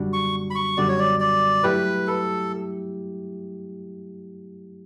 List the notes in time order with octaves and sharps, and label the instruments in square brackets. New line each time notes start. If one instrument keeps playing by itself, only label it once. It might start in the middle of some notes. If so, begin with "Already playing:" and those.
Already playing: [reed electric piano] F#2 D3 G3 D4 F#4
[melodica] C#6
B5
C#6
[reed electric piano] F#2 D3 G3 D4 F#4 [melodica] D5
[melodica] C#5
D5
D5
[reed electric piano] G2 F#3 A3 E4 G4 [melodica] B4
[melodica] A4